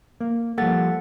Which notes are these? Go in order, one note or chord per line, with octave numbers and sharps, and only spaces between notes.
A#3
F3 G3 A#3 A4 F#5 A6